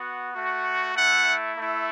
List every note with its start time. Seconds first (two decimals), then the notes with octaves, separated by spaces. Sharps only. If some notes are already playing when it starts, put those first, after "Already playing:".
Already playing: B3 F#4
0.33 A3 F#4
0.95 A3 E4 F#5
1.57 A3 E4